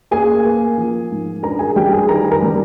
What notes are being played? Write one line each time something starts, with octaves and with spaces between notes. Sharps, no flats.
A#3 G#4 G#5
A#3
F3
G#2
D4 A#4 A#5
G#4 G#5
G3 G4 G5
G#4 G#5
D#3 A#4 A#5
A#4 A#5
G3